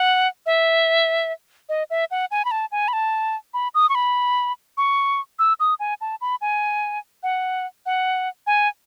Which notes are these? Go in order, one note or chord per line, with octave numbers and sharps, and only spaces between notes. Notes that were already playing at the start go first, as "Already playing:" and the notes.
Already playing: F#5
E5
D#5
E5
F#5
G#5
B5
A5
G#5
B5
A5
B5
D#6
C#6
B5
C#6
E6
D#6
G#5
A5
B5
G#5
F#5
F#5
G#5